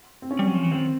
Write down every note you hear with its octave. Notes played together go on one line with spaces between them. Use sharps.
C4
C#4
G3
F#3
F3
E3
D#3 C4